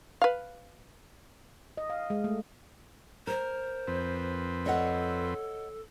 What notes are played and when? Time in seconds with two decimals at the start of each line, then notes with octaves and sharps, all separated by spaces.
0.22 B4 F5
1.77 D#5
1.90 F5
2.10 G#3
2.24 A3
3.27 A#4 C5
3.88 F2 C4 B4
4.66 A4 C#5 D#5 F#5